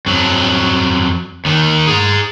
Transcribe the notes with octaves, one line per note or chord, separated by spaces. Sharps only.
F2 F#3
D#2 D#3
G#4 A#5